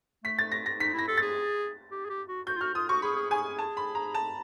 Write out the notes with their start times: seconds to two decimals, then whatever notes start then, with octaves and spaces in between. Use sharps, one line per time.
0.24 A3 B6
0.38 A6
0.52 A#6
0.66 A#6
0.80 D#4 B6
0.94 E4
0.99 A#6
1.08 A4
1.17 G#4 A6
1.91 G4
2.05 G#4
2.10 G4
2.28 F#4
2.47 F#4 G6
2.56 F4
2.61 F#4 F6
2.75 F4 D#6
2.89 F#4 C#6
3.02 G#4 B5
3.16 G#4
3.30 G#4 G#5
3.45 G#4
3.59 A5
3.77 B5
3.95 A#5
4.14 A5